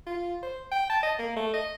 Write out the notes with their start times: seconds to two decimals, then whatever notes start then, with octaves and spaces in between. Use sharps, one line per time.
0.06 F4
0.43 C5
0.71 G5
0.90 A5
1.03 D#5
1.19 A#3
1.36 A3
1.53 D#5